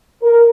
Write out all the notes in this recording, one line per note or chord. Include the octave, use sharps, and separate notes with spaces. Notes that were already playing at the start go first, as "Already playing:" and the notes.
A#4